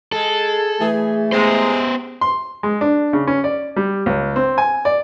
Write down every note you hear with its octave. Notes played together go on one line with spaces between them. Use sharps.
G#3 A4
E3 A3 G#4
C3 G#3 B3 C5
C6
G#3
D4
C#3
C#4
D5
G3
C#2
C4
G#5
D5